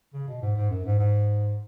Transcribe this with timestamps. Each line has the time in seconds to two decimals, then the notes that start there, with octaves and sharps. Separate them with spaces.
0.14 C#3
0.28 B2
0.42 G#2
0.56 G#2
0.70 F#2
0.85 G#2
0.98 G#2